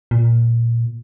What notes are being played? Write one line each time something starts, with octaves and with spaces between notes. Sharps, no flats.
A#2